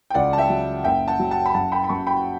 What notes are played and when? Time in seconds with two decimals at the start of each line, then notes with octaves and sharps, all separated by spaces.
0.10 G5
0.14 C#2 D5 F#5
0.33 A5
0.38 E5 G5
0.50 F#3
0.84 F#1 E5 G5
1.08 F#5 A5
1.19 F#3
1.31 F#5 A5
1.46 B5
1.54 F#2 F#5 A5
1.72 G5 B5
1.84 B5
1.89 F#2 A5 C#6
2.07 G5 B5